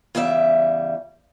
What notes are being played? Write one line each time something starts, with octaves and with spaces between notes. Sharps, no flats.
E2 C#3 G3 E5